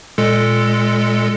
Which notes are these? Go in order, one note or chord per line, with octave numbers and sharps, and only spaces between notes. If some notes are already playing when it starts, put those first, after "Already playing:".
A#2 G#3 A4